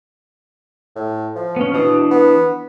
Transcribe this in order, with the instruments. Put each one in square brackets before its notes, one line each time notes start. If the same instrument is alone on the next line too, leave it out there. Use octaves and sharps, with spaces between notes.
[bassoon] A2
F3
[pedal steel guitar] B3 C#4
[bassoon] B2 [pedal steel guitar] E3 D4 D#6
[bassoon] B3